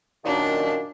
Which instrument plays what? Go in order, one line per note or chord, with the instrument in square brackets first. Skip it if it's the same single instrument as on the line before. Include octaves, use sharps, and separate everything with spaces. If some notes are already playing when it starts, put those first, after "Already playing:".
[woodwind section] F#2 A#2 D#3 [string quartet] D4